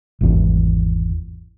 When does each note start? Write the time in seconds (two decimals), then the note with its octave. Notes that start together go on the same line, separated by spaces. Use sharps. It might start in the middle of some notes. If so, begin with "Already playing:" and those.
0.21 G#1 E2